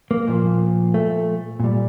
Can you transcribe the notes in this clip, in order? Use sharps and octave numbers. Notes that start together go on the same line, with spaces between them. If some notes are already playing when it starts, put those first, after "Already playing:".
A#3
A#2 F3
A3
A#2 G3